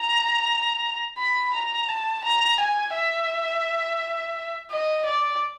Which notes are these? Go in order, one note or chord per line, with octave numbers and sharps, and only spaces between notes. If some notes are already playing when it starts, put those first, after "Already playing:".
Already playing: A#5
B5
A#5
A5
A#5
G#5
E5
D#5
D5